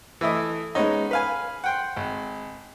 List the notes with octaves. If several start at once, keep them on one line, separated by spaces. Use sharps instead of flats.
E3 A3 E4 D#5
G#3 B3 C#4 D#4
B4 F5 G#5
F#5 G5 C6
G#1